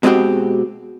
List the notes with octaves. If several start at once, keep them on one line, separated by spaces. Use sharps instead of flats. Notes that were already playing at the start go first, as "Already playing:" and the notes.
B2 G#3 C4 C#4 F#4 G4